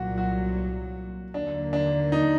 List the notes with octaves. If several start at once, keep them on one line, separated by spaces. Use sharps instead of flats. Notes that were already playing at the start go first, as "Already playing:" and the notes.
Already playing: C2 A#2 F#3 F#4
F#4
D#2 D3 F#3 A#3 D4
D4
D#4